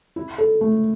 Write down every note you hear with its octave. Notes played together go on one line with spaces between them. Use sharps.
E4
A4
A3